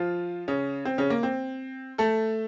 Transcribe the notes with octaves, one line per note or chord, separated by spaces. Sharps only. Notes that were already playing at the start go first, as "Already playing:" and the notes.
Already playing: F3 F4
C#3 C#4
C4
C#3 C#4
A#3
C4
A3 A4